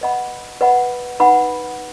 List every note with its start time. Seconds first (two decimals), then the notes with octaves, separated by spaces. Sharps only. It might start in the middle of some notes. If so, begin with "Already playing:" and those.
0.01 B4 D#5 F#5 B5
0.61 B4 D#5 F#5 B5
1.20 D#4 B4 F#5 B5